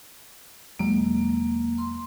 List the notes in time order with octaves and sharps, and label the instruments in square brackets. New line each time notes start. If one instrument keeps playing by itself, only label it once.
[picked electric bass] E1 F#3 G#3 [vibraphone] A#3
[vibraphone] C6